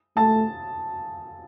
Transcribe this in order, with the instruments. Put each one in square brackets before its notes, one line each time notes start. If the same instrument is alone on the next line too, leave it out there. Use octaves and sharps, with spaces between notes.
[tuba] A3 [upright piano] A5